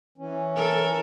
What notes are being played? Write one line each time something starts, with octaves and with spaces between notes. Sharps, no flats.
E3 C#4
A4 A#4